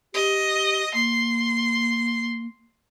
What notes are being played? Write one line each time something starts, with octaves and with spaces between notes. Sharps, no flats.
G4 D#5
A#3 C6